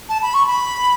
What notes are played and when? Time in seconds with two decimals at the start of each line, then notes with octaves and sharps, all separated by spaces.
0.09 A5
0.22 B5
0.34 C#6
0.47 B5